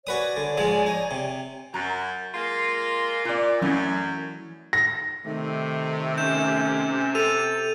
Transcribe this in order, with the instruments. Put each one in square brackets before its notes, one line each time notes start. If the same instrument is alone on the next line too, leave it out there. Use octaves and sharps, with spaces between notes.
[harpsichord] F#4 B4 D#6 [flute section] C#5 D5 G#5
[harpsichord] D3
G#2 F3 G#3
D#4
C3
[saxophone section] F#2 [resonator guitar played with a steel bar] F#3 A#5
[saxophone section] G#3 A#3 F4
[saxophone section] A#2 [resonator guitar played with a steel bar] F4 D5
[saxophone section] F#2 [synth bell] E3 F#3 E4 [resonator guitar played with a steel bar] A3 C#4
[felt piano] A#6
[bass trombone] C3 [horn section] D#3 A3
[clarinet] C#4 [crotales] G6 E7
[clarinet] A4 [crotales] D#7 F7